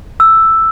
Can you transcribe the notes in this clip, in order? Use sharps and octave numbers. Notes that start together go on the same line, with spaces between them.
E6